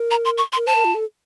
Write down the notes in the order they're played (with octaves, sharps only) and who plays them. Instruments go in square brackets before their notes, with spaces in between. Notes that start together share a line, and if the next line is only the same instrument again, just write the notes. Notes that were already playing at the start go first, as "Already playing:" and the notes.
Already playing: [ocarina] A#4
[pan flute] A#5
C6
C#6
C6
[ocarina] A#4
[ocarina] C5 [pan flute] A5
[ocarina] A#4
F4
A4